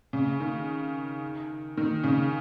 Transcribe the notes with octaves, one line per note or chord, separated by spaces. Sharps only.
C#3
D#3
D#3
C#3